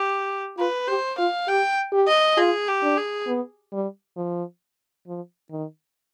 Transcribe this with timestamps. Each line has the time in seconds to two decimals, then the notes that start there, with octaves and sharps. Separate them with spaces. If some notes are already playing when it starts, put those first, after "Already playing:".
Already playing: G4
0.58 F4 B4
0.88 G4 C5
1.18 F4 F5
1.47 G4 G5
1.92 G4
2.08 D#5
2.37 F4 G#4
2.68 G4
2.82 D4
2.97 G#4
3.27 B3
3.72 G3
4.17 F3
5.07 F3
5.51 D#3